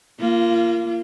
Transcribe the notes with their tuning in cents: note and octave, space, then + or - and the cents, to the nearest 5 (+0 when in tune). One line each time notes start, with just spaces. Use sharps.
A#3 -5 F4 -30